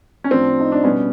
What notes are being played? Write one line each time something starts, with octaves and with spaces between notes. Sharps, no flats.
C#4
A2 F3 C4 D4
D#4
D4
B2 G3 B3 C#4